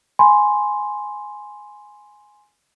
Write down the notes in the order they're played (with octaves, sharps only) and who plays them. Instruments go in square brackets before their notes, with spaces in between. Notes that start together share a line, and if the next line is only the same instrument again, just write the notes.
[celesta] G#5 B5 C6